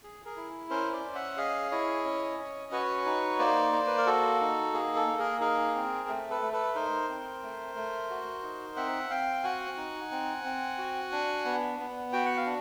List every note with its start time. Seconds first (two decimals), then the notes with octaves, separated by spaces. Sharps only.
0.04 G#4
0.25 G#4 A#4
0.37 E4
0.70 C#4 A#4 C5
0.93 C5 D5
1.04 C#4
1.15 E5 F#5
1.37 G#4 D#5 F5
1.72 E4 C#5 D#5
2.05 C#4
2.38 C#4
2.72 F#4 B4 C#5
3.05 D#4
3.39 A#3 C5 D5
3.72 A#3
3.87 B4
3.98 A#4
4.07 F#4 A4
4.41 D#4
4.73 A#3 G#4
4.96 A4
5.07 A#3
5.19 G#4 A#4
5.40 D#4 G#4 A#4
5.75 C4
6.09 A3
6.30 A4 B4
6.42 A3
6.52 A4 B4
6.75 D#4 A#4 C5
7.09 C4
7.43 A3
7.76 A3
8.10 F#4
8.43 D#4
8.76 C4 E5 F#5
9.10 C4 F5 G5
9.43 F#4 F#5 G#5
9.77 D#4
10.11 C4
10.44 C4
10.78 F#4
11.12 D4
11.45 B3
11.79 B3
12.13 F#4 G5
12.25 F#5
12.37 F5
12.46 D4